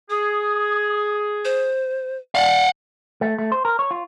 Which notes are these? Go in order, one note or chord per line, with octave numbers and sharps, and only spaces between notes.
G#4 D#6
C5
D5 F5 F#5
A3
A3
C5
A#4
C#5
F4